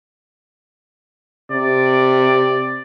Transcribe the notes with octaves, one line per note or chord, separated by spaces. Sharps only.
C3 D5